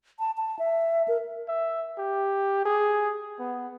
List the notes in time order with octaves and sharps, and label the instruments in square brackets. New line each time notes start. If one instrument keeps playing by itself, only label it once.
[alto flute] A5
A5
E5
A#4
[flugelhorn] E5
G4
G#4
B3